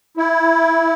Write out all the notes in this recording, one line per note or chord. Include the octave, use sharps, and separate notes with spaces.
E4